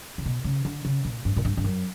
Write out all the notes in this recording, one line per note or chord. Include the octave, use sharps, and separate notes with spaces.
C#3
B2
C#3
D3
C#3
A#2
G2
A#2
G2
G2
F#2